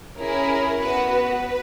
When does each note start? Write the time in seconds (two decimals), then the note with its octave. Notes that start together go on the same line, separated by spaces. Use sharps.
0.17 C#4 E4 G#4 A#4
0.79 B3 F#4 B4
1.11 B4